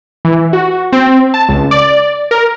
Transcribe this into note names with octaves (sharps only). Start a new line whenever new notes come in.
E3
F#4
C4
A5
C#2
D5
A#4